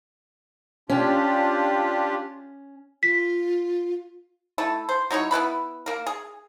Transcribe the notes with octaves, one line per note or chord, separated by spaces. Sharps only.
C#4 D4 F4 G4
F4 B6
A3 E4 A4
C5
F#3 D#4 E4 C#5
B3 E4 B4 B5
A#3 A#4
G#4